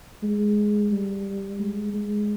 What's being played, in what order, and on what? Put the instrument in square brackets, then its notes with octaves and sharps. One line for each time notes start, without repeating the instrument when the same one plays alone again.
[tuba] G#3
G3
G#3
G#3